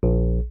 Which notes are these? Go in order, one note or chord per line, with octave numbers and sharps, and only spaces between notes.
A#1